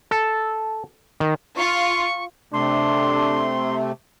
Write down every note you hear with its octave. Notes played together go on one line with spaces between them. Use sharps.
A4
D#3
F4 C#6
C3 A3 D4 C6